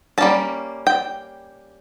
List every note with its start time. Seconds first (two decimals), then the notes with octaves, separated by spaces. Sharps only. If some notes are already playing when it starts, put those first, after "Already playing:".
0.18 G3 A#3 C#4 A5
0.87 G5